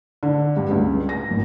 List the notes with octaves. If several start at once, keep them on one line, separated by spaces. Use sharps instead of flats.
D3
G2
C#2
A#6
G#1